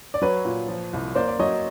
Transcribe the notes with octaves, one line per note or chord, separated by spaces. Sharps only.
D5
F#3 B4 C#5
A#2
F3
C2
A#3 C5 D5
D5
F#3 C#5 D#5